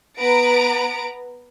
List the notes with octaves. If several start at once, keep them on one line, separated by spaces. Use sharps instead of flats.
B3 B4 A#5 D7